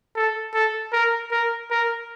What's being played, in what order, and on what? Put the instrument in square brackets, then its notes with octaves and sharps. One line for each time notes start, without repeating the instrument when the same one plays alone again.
[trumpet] A4
A4
A#4
A#4
A#4